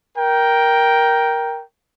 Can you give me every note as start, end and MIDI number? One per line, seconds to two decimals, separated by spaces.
0.17 1.62 70
0.17 1.62 79